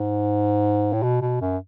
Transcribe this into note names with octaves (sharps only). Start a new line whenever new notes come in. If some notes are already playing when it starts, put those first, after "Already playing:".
Already playing: G#2
A2
B2
B2
F#2